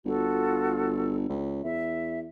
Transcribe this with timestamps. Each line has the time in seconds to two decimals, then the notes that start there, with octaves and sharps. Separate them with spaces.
0.05 G1 F4 F#4 A4
1.29 C#2
1.64 E2 E5